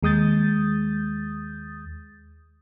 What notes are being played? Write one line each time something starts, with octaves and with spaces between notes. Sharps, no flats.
D#2 G#3 D#6 G6 A6